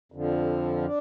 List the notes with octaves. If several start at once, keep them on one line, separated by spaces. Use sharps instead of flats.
F2 D3 F3
D4